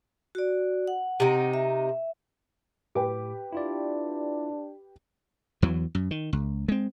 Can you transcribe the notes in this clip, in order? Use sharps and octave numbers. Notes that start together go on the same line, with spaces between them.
F#4 D5
F#5
C3 D#4
E5
A2 G4 B4 G5 D6
D4 E4 F4 D5
E2 E3 F#3
F#2
D#3
C#2
G#3 C4